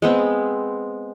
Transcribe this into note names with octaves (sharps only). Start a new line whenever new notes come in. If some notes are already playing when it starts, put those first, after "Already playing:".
G#3 B3 C4